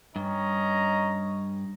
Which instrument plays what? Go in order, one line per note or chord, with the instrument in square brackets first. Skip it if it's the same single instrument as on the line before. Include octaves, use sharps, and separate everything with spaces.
[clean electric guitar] G2 [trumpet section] C#4 D#5 A#5